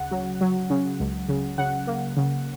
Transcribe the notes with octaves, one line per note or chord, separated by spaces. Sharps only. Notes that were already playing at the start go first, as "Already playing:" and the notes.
Already playing: D2 C#3 F#5
F#3
F#3
C#3
C#2
C#3
C#3 F#5
A#3
C#3